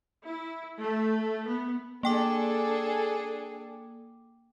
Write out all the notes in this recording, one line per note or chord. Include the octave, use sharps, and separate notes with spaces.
E4
A3
B3
A#3 D4 G#4 A4 G5 D6